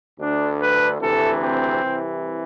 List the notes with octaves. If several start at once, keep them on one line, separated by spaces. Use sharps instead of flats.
D2 D3 D4
B4
D2 C3 E3 A4
C4
C2 C3 E3